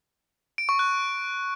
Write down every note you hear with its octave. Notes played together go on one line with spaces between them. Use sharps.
D7
C#6
F#6